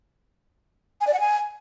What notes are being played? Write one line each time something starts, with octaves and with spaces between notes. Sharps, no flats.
G#5
D5
F#5
G#5